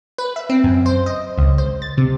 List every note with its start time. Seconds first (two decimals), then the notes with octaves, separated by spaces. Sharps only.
0.18 B4
0.36 E5
0.50 C4
0.64 F#2
0.86 C5
1.06 D#5
1.38 C#2
1.58 C5
1.82 A6
1.98 C3